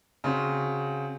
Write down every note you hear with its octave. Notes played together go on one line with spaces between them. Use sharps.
C#3 C4 F#4